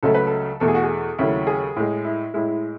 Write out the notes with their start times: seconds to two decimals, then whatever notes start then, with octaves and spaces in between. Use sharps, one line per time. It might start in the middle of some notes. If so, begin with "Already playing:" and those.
0.03 C#2 C#3 F#3 A3 A4
0.15 B4
0.27 A4
0.60 E2 B2 A3 A4
0.68 G#4
0.75 F#4
0.83 G#4
1.18 D#2 C#3 F#3 A3 E4
1.47 G#4
1.76 A2 G#3
2.05 E4
2.34 A2 G#3 E4
2.49 E4